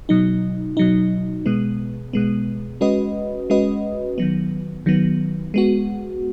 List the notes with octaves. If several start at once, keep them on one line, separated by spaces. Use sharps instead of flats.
B2 F#3 D#4
B2 F#3 D#4
B2 G#3 B3
B2 G#3 B3
G#3 C#4 F#4 B4 D#5
G#3 C#4 F#4 B4 D#5
D#3 F#3 B3
D#3 F#3 B3
G#3 B3 F#4